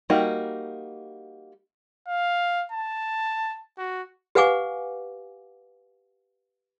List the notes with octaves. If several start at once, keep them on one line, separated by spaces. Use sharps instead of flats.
G3 A#3 D#4 F#4
F5
A5
F#4
G4 B4 F5 F#5 G#5 D6